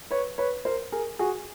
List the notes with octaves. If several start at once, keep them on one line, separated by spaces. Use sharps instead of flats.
B4 C#5
B4 C#5
A#4 C5
G#4 A#4
F#4 G#4